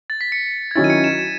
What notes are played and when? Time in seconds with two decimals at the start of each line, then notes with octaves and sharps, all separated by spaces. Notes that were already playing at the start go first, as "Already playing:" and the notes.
0.10 A6
0.21 B6
0.32 C#7
0.71 G#6
0.75 D#3 F#3 C#4 E4 A6
0.84 D#7
0.90 C#7
1.04 E7
1.19 E7